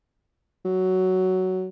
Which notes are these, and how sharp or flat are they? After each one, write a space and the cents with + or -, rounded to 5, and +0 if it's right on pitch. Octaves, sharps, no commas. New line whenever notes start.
F#3 +10